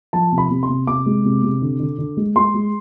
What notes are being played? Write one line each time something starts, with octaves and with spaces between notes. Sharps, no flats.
F3 A5
C3
B5
C3
C6
C3
C3 D6
G#3
C3
C3
D3
D3
D3
G#3
G#3 C6
G#3